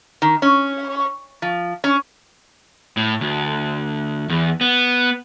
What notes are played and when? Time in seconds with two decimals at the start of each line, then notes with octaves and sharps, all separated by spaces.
0.22 D#3
0.42 C#4
1.42 F3
1.84 C#4
2.97 A2
3.21 D2
4.30 E2
4.61 B3